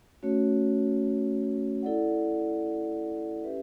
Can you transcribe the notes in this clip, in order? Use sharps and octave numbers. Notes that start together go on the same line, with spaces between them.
A3 C#4 F#4 C#5
E4 A4 D5 F#5
C#4 G4 B4 E5